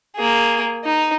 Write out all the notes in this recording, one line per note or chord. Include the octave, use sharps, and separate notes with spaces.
A#3 G#4
D#4